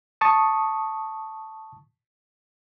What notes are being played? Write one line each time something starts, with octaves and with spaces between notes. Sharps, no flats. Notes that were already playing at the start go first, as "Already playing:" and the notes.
A5 C#6 D#6